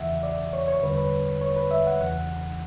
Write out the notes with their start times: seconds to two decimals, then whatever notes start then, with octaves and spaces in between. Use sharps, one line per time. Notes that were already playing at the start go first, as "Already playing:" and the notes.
Already playing: E2 C#3 E3 E5 F#5
0.23 D5
0.53 C#5
0.68 C#5
0.83 E2 D3 G3 B4
0.91 C#5
0.98 B4
1.42 C#5
1.56 B4
1.71 E5
1.87 F#5
2.01 E2 C#3 E3 F#5